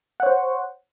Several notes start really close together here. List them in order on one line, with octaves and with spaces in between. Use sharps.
F#5 C#5 C5